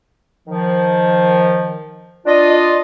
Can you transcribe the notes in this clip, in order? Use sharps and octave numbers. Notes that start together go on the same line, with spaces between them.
D#3 F3
D4 F4 D#5